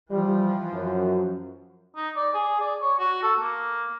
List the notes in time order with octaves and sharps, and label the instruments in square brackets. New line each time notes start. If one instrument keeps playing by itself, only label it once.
[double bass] E3 F3 [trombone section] G3
[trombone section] F#2
[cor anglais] D#4
D5
G#4
D5
C#5
F#4
A4
A#3